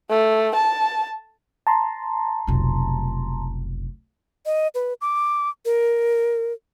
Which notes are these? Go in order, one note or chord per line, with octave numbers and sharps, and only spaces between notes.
A3
A5
A5 A#5 C6
F1 B1
D#5
B4
D6
A#4